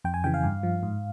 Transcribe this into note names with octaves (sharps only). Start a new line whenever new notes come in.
F2 G5
G#5
C#3 E3 G5
F5
G2
F3
G#2